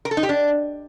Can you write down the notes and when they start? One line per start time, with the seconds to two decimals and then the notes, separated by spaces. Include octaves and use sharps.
0.05 A#4
0.11 A4
0.17 D#4
0.23 G4
0.29 D4